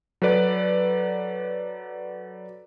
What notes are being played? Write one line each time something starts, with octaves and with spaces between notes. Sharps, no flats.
F#3 A4 B4 D5